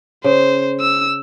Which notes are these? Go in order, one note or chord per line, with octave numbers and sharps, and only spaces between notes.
C#3 C5
E6